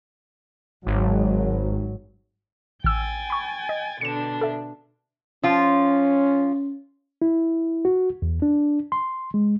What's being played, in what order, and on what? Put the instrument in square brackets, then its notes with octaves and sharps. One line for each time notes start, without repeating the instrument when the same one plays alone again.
[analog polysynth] G#1 [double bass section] G#2 F#3
[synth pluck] A1 E6 [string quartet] G5 G#5 A6
[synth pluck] B5 C#6
D#5
[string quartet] B2 D3 D4 [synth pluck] C#7 E7
[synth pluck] A4 E5
[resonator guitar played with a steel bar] F3 F4 [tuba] C#4
[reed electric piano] E4
F#4
E2
D4
C6
G#3